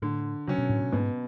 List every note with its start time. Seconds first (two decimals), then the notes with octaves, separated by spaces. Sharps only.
0.02 A2 D3
0.47 C#3 F#3 C#4
0.58 B2
0.69 A2
0.80 B2
0.92 G#2 B2